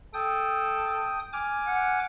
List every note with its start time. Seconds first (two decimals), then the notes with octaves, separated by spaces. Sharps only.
0.14 A4 G5 D#6
1.33 G#5 D6 F6
1.67 F#5